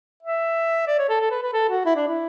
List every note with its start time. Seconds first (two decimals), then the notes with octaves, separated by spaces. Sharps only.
0.23 E5
0.87 D5
0.99 C#5
1.09 A4
1.21 A4
1.31 B4
1.42 B4
1.53 A4
1.69 F#4
1.85 E4
1.96 D4
2.08 E4